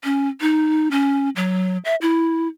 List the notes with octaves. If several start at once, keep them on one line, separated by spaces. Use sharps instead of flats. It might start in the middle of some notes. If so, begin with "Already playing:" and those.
C#4
D#4
C#4
F#3
E5
E4